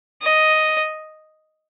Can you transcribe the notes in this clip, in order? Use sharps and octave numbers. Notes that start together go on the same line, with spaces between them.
D#5